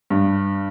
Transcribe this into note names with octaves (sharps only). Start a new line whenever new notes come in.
G2